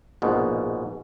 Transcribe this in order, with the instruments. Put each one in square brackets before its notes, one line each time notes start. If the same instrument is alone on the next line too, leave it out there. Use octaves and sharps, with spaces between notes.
[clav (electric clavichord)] A#1 G#2 B2